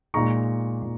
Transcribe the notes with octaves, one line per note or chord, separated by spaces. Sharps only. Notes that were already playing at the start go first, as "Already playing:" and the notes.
A#2 G#3 D#4 A#5 C#6
A#2